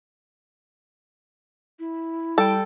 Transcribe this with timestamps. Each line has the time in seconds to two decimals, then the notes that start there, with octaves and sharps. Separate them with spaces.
1.79 E4
2.38 G3 A4 G5